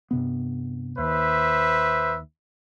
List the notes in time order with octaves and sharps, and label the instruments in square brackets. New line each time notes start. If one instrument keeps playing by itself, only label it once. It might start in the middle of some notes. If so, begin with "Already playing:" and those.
[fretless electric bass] G2 C3 B3
[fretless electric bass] D#2 [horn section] B4 C5 E5